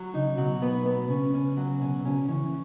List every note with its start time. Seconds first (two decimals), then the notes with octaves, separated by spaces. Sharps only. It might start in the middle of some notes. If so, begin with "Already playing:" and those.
Already playing: F#3
0.14 C#3 D#4
0.37 B2 F#3
0.62 B3
0.85 B3
1.09 C#3 C#4
1.34 C#4
1.57 F#3
1.81 B2 C#4
2.05 C#3 C#4
2.28 E3 C#4